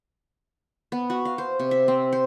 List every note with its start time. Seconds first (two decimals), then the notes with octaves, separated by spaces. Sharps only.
0.92 B3
1.10 F#4
1.25 F5
1.38 C5
1.59 C3
1.71 E5
1.88 C4
2.13 C5